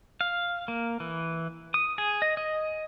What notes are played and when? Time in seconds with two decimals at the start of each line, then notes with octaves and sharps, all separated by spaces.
0.21 F5
0.68 A#3
1.00 E3
1.74 D#6
1.98 G#4
2.22 D#5
2.37 D#5